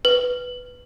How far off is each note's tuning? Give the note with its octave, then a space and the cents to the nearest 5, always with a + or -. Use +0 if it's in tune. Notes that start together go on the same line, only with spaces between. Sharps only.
B4 +0